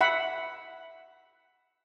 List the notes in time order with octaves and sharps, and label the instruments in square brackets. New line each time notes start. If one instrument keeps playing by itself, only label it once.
[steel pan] E5 F#5 B5